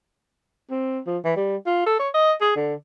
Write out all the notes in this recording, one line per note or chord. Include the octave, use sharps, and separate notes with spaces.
C4
F3
E3
G3
F4
A4
C#5
D#5
G#4
D3